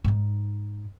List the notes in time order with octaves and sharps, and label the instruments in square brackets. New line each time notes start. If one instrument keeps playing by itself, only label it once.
[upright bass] G#2 D#4